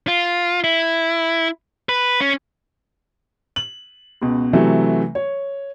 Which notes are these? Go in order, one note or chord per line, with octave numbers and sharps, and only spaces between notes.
F4
E4
B4
C#4
F#7
C#2 B2
C3 E3 F#3 A3
C#5